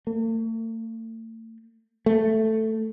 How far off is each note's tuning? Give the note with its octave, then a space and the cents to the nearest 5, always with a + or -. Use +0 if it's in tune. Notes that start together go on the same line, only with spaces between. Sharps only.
A3 +40
A3 +5